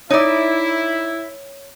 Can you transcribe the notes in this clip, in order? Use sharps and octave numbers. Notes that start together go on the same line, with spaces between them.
D#4 E4 C#5 D5